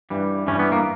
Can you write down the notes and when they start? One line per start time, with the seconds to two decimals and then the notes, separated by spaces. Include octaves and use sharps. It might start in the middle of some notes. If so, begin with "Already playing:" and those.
0.10 G2 E3 G3
0.47 G2 E3 G3 C#4
0.59 B3
0.72 A#3